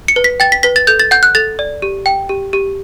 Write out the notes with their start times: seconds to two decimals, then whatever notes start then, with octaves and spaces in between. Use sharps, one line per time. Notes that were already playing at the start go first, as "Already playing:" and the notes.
0.08 C#7
0.16 B4
0.24 B6
0.40 G5 A6
0.52 B6
0.63 B4 B6
0.76 A6
0.87 A4 G6
1.00 A6
1.11 F#5 G6
1.23 F#6
1.35 A4 A6
1.59 D5
1.82 G4
2.06 G5
2.29 G4
2.53 G4